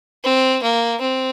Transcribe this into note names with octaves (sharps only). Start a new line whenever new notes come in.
C4
A#3
C4